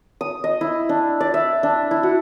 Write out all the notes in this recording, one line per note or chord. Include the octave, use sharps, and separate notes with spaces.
D#6
D#5
E4
D4
D5
E5
D4
E4
F#4